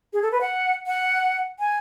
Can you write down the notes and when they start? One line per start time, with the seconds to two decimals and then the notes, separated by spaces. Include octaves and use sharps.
0.13 G#4
0.22 A4
0.32 B4
0.41 F#5
0.87 F#5
1.59 G#5